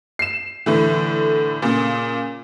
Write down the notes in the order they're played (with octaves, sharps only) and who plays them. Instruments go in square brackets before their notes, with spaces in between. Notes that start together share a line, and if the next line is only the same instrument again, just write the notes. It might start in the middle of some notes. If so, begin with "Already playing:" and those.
[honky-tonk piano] C7 E7
A2 D3 E3
A#2 C#3